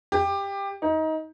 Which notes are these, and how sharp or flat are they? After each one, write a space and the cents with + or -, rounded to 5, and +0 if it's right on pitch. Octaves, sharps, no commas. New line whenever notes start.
G4 +15
D#4 +20